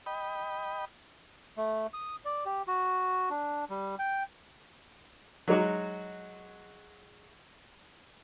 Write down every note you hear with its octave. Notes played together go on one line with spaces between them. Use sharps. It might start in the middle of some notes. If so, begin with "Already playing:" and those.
D#5 G5 B5
A3
D#6
D5
G4
F#4
D4
G3
G5
F#3 G#3 D#4 F#4